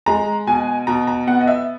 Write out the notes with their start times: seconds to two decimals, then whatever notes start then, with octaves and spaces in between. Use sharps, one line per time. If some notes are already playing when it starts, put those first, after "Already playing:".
0.06 G#3 A#5
0.47 B2 G#5
0.87 B2 A#5
1.07 A#5
1.27 B3 F#5
1.41 D#5
1.47 E5